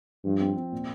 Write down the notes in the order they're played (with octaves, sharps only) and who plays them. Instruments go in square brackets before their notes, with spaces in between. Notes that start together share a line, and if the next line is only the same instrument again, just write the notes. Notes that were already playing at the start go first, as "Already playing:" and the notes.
[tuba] G2 [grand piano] F3
[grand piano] C4
C4
A#2